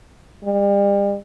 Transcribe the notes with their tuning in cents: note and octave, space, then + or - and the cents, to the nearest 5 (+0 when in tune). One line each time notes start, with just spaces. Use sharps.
G3 +40